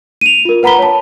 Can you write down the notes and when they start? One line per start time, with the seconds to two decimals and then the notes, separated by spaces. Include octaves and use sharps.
0.21 D#7 F7
0.45 F4 A#4
0.63 B4 F#5 A#5 B5 B6 G7
0.79 C#5 A5